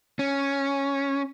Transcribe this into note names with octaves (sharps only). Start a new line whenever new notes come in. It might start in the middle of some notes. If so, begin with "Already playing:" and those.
C#4